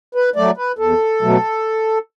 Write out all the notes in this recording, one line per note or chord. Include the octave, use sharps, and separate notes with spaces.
B4
F#3 A3 D5
B4
E2 A4
B2 F#3 A3